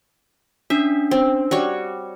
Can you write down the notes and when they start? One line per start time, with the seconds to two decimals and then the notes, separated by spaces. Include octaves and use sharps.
0.70 C#4 D4 E5
1.11 C4
1.51 G3 F#4 C#5